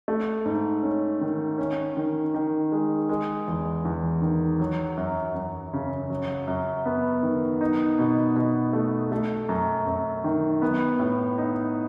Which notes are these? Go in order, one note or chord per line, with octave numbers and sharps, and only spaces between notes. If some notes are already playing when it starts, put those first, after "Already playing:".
A3
G#2
C#4
D#3
C#4
D#3
D#3
G#3
G#3
E2
E2
D#3
F#3
F#2
F#2
C#3
F#3
F#2
B3
D#3
D#4
B2
B2
A3
A3
F#2
F#2
D#3
B3
A2
D#4